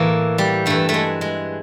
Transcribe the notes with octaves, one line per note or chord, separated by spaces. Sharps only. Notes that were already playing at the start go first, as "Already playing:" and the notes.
Already playing: A2 E3 A#3
G3
G2 E3 A3
A3
G#3
G#3